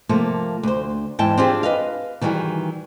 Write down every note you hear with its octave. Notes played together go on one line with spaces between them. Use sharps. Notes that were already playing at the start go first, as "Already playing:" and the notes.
C3 F3 A3 A#3
D2 C5
E2 G#2 E4 G5 A5
C4 D4 F4 G4 G#4
B4 D#5 F5
D#3 E3 G3 F#4 G#4